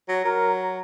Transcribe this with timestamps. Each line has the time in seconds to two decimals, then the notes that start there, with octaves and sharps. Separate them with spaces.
0.09 F#3
0.24 F#3 A#4